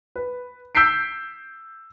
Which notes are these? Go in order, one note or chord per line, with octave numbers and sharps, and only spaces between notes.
B4
E6 G6 B6 C7 D7